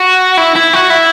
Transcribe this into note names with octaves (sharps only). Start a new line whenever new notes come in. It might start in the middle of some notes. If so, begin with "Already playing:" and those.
Already playing: F#4
E4
E4
F#4
E4